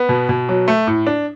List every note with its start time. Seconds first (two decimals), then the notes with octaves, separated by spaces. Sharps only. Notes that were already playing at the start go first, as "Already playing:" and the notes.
Already playing: B3
0.09 B2
0.29 B2
0.49 F#3
0.68 A3
0.87 A2
1.07 D4